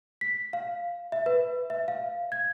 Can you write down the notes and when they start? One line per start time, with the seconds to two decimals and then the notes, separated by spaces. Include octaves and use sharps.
0.21 B6
0.53 F5
1.12 E5
1.26 B4
1.70 E5
1.88 F5
2.32 G#6